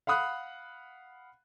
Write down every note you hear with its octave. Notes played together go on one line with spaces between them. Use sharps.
F5 F#5 B5 D#6 F#6